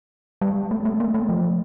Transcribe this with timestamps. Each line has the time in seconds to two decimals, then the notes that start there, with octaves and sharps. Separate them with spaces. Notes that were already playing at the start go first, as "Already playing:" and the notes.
0.42 G3
0.71 A3
0.85 A3
1.00 A#3
1.14 A3
1.29 F3